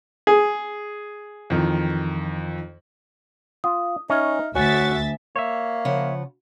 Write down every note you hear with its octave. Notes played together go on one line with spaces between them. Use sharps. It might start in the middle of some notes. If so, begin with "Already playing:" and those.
G#4
F2 D#3 E3
F4 D#6
C#4 D#4 E5 F6
D2 F#4 C#5 E5 G#5 A6
A#3 C#5 E5
C#3 F3 F#5